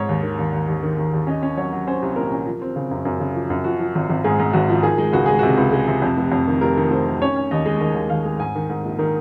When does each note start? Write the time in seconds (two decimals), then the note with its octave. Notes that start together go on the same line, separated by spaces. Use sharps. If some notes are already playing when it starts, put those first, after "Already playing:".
Already playing: G#2 C#5
0.09 D#2
0.23 D#3
0.39 D#2
0.53 D#2
0.68 D#2
0.83 D#3
0.98 D#2
1.13 D#2
1.27 C#4 D#5
1.43 C#4
1.57 F#3 C#5
1.72 F#3
1.87 C#4 C5
2.02 C2
2.16 A#2 A#4
2.32 C#4
2.46 F3
2.62 C4
2.76 C#3
2.91 F#2
3.05 F#2
3.20 C#3
3.35 F3
3.50 F#2
3.64 F3 F#4
3.80 F3
3.95 G#1
4.10 G#1
4.24 G#2 G#4
4.39 G#2
4.53 G#1 F#4
4.69 F3
4.83 D#3 G#4
4.98 G#3
5.13 C#2 F#4
5.26 G#3 G#4
5.39 C3 F#4
5.58 C#2
5.72 G#3
5.88 C3
6.02 F2
6.17 F1
6.32 F2
6.47 D#3
6.61 F1 A#4
6.77 D#3
6.91 F1 C5
7.06 D#3
7.22 C#4 C#5
7.36 C#4
7.51 D#2 D#5
7.66 G#3
7.81 D#3 D#5
7.95 D#2
8.10 D#2 F5
8.25 G#3
8.39 G#2 G#5
8.55 D#3
8.70 G#2
8.84 A#1
8.99 D#3 A#4